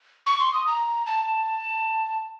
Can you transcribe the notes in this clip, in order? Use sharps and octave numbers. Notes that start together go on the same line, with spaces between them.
C#6
C6
D#6
A#5
A5